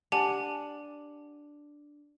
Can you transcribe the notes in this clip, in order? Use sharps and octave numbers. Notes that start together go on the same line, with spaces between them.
D4 G4 F#5 G#5